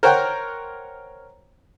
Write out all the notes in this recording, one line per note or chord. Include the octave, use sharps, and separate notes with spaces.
A#4 C5 C#5 F#5 G5